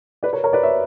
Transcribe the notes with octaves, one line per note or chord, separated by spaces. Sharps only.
B4 D5
A#4 C#5
A#4 C#5
B4 D5
C#5 E5